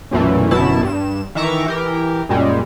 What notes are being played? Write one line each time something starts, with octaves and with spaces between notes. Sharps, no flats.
B1 F#2 A#2 E3 A3
G1 F#2 B2 E4 A5 E7
G2 E7
D#3 E3 E5 A#5 C#6 D6
E3 G4 A#4
F#2 A#2 G3 G#3